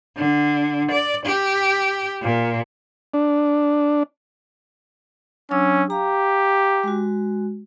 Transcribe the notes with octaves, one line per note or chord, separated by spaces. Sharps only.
D3
D5
G4
A#2
D4
F#3 C#4 D4 E6
G4 F5 A#5
G#3 F#4